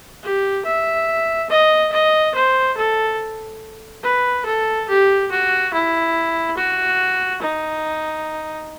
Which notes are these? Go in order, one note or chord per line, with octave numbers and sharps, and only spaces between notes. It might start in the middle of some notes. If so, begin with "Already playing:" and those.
G4
E5
D#5
D#5
C5
A4
B4
A4
G4
F#4
E4
F#4
D#4